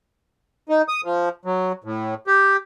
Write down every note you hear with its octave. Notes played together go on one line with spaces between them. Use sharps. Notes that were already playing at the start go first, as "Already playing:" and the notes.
D#4
D#6
F3
F#3
A2
G4